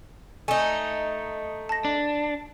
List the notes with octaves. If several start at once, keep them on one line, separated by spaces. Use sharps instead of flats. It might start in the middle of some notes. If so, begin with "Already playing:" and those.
A3 D#4 G#5
A5 A#6
D4